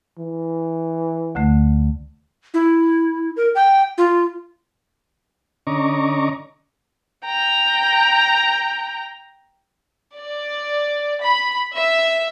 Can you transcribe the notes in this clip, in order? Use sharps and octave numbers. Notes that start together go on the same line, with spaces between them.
E3
D2 D3 A3
E4
A#4
G5
F4
D3 C#4 D#5 A#5 C#6 D6
G5 A#5
D5
B5
E5